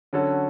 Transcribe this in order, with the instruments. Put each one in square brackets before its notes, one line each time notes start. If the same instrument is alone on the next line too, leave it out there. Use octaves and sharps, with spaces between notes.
[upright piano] D3 F#3 C#4 F#4 A4